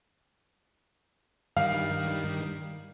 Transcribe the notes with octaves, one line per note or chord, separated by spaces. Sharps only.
G2 D#3 G3 F5